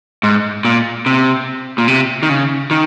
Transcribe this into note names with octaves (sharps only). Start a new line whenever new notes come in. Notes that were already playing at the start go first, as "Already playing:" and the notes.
G#2
A#2
C3
A#2
C3
D#3
C#3
D#3